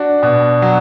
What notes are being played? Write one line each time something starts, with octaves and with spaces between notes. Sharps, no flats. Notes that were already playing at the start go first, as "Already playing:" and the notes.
Already playing: D4 F#4
B2
F#3